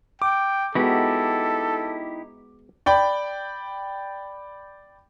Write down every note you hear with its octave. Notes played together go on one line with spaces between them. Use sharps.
G5 D6
G#3 B3 D#4 E4 F#4 G4 A4
D5 G5 B5